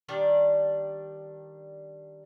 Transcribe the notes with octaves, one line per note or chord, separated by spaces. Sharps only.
D#3 G3 D4